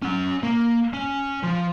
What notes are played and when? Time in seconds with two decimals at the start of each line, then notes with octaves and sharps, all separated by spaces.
0.02 C#4 F#5
0.43 A#3
0.93 C#4
1.44 F3